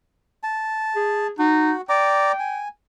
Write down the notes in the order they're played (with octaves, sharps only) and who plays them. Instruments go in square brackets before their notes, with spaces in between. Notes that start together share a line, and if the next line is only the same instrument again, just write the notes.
[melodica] A5
[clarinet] G#4
[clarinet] D#4 [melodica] F#4
[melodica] D5 A#5 D6 [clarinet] G5
[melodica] G#5